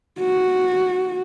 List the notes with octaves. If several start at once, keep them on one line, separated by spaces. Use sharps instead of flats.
F#4